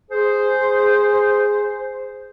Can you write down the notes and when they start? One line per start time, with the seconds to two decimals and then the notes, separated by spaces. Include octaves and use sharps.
0.11 G#4 C5